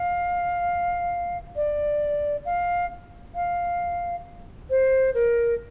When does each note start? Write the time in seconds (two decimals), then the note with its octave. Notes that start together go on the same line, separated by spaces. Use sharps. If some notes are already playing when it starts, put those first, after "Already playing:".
Already playing: F5
1.56 D5
2.45 F5
3.35 F5
4.70 C5
5.14 A#4